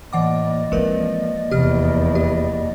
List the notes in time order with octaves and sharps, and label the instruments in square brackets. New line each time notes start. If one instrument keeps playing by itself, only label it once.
[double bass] A2 [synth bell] E3 F#5 D6 [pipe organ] A#3 D5 D#5
[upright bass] E3 C4 [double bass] F3 [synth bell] G#3 A#4 B4
[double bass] F1 E2 [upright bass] C3 [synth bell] G4 F6
[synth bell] G4